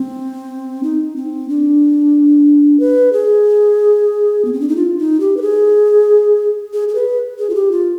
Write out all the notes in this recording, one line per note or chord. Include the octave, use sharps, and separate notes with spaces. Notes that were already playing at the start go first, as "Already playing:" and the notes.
Already playing: C4
D#4
C4
D4
B4
G#4
B3
C4
D4
D#4
F4
D#4
G4
B4
G#4
G#4
G#4
B4
G#4
F4
G4
F4